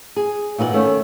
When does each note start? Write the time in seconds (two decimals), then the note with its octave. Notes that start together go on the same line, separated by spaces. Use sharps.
0.16 G#4
0.58 A#2 E3 D#4 C#5 F#5
0.73 D#3 A3 C#4